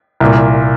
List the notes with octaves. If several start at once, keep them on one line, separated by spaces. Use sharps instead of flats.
C2 A#2